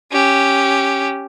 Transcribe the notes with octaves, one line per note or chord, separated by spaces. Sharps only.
C#4 G4